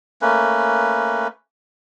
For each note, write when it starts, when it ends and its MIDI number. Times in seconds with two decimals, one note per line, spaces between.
0.22 1.28 57
0.22 1.28 58
0.22 1.28 61
0.22 1.28 71